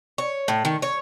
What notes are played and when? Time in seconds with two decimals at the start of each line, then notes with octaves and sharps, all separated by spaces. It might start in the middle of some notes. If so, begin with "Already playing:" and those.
0.18 C#5
0.48 A2
0.65 D#3
0.82 C#5